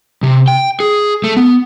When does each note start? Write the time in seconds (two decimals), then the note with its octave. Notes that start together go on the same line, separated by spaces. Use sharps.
0.23 C3
0.48 G5
0.80 G#4
1.24 A3
1.37 B3